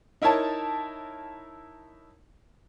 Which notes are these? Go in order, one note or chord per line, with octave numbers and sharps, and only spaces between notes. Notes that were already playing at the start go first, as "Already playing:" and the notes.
D#4 E4 A#4 C#5 A5